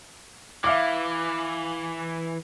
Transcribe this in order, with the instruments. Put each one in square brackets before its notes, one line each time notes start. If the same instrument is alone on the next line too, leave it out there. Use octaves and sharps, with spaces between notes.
[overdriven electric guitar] E3 [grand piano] E5 F5 D6